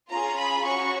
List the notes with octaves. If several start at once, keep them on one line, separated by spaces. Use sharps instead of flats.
C#4 F4 G#4 A#5
B5
C#4 F#4 C#6